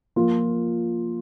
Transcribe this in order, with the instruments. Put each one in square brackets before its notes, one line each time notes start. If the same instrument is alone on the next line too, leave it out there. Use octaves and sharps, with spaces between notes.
[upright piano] F3 A#3 F4